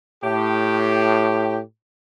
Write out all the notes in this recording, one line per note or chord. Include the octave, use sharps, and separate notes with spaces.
A2 G4